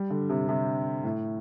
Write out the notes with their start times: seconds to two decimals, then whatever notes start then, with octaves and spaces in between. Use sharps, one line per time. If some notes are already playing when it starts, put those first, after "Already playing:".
Already playing: G3
0.10 D3
0.30 C3
0.48 C3
1.04 A2